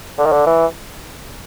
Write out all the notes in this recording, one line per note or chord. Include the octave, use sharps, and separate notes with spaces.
D3
D#3
D3
E3